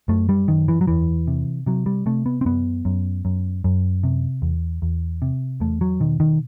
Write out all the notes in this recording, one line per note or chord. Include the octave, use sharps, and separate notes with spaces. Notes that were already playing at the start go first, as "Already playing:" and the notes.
F#2 A3
G3
F#2 D#3
E3
F#3
E2 E3
C3
C3 F#3
G3
C3 A3
B3
C4
F#2 B3
F#2
F#2
F#2
C3
E2
E2
C3
E2 A3
F#3
B2 D#3
D#3